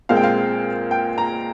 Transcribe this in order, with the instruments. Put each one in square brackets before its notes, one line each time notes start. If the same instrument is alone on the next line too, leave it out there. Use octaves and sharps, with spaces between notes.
[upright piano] A#2 G#3 C4 F5
G5
F5
G5
A#5